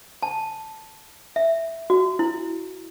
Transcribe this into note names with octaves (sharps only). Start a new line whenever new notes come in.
A5
E5
F#4
E4